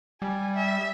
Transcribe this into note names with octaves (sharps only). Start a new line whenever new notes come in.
G3 G#5
E5